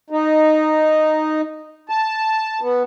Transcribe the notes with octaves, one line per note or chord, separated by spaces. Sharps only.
D#4
A5
B3